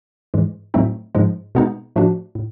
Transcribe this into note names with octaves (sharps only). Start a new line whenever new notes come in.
G#2 E3 G#3
A2 F#3 A3 C4 D#4
G#2 F3 G#3
B2 G#3 B3 D#4
A2 F3 A3 D4 F#4
A2